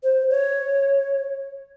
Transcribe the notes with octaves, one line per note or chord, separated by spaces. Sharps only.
C5
C#5